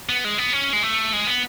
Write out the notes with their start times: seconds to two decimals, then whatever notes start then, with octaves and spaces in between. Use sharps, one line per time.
0.09 B3
0.24 G#3
0.38 B3
0.53 C#4
0.73 G#3
0.83 A3
1.13 G#3
1.27 B3